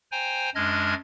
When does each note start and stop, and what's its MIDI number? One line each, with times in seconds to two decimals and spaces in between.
0.12 0.50 72
0.12 0.50 79
0.12 0.50 80
0.12 0.50 82
0.55 0.94 42
0.55 0.94 56
0.55 0.94 62
0.55 0.94 75
0.55 0.94 89
0.55 0.94 92